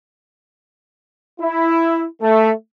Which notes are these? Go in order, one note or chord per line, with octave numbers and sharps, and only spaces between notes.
E4
A3